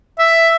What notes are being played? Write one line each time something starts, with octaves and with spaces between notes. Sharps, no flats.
E5